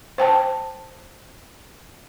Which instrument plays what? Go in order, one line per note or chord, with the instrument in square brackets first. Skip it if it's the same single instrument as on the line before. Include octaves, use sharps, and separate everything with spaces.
[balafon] C5 G5 A5